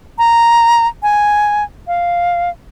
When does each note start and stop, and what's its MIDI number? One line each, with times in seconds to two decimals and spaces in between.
0.18 0.87 82
1.03 1.64 80
1.88 2.50 77